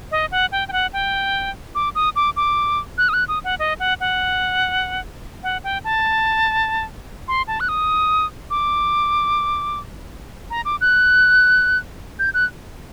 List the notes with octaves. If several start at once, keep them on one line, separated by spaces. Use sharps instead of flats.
D#5
F#5
G5
G5
F#5
G5
D6
D#6
D6
D6
F#6
D#6
F#6
D#6
F#5
D#5
F#5
F#5
F#5
G5
A5
C6
A5
F#6
D#6
D6
A#5
D6
F#6
G6
F#6